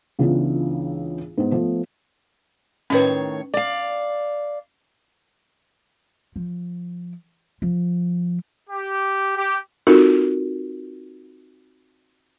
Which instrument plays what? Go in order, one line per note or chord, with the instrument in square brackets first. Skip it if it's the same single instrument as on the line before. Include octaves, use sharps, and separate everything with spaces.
[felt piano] C#2 C#3 E3 B3 D4 F4
G#2 B3
F3 A3 B3
[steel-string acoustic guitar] A2 D#3 C#5 [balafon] C#4 B4
[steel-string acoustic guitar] D5 F5
[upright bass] F3
F3
[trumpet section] G4
G4
[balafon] C4 D#4 F4 F#4 A4 A#4